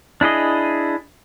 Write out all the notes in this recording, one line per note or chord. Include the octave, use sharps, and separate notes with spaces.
D4 E4 G#4 D#5